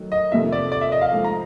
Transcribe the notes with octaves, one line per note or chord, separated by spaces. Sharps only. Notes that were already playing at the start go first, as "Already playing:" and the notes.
Already playing: D#3 F#3 A3
D#5
F2 C3 D#3 E5
D5
D5
E5
D#5
F5
G#2 F3 A3
A#5